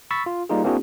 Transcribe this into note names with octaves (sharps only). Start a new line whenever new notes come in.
B5 C#6 E6 A6 B6
F4
G3 A#3 D#4 F4 G#4
A#3 C4 D4 E4 F#4 G#4